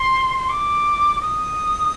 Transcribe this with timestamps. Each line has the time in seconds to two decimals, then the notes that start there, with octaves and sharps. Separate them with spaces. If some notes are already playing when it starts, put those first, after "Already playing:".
Already playing: C6
0.38 C6
0.49 D6
1.22 D#6